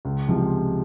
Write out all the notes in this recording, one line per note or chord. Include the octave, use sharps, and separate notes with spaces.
C#2
C3 F3 G#3